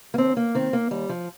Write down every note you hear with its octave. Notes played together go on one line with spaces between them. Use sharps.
A#3
D#2 C4
A#3
D#3 C4
A#3
D#2 G3
F3